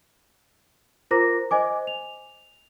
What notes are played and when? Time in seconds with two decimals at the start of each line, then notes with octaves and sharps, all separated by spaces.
1.11 F4 A#4 C5 A#5 D6 A#6
1.51 C5 D#5 G#5 D6
1.87 F7